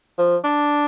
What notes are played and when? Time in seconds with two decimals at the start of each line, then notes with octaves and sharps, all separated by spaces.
0.19 F3
0.44 D4